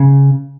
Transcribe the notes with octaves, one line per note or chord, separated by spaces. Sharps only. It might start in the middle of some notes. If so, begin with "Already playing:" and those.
Already playing: C#3